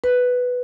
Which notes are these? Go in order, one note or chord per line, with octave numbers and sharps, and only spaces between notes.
B4